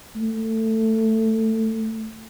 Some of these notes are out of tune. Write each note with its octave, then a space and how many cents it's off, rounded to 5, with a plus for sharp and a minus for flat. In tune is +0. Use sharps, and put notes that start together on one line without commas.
A3 +15